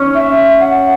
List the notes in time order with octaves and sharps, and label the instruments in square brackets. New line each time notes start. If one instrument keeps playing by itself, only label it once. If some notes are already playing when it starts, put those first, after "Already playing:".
Already playing: [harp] C#4
[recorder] E5
F#5